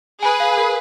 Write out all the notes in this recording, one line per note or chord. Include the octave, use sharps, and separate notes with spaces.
G#4 B4 G#5
F5
A#4